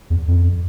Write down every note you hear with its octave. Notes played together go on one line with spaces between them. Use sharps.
E2
F2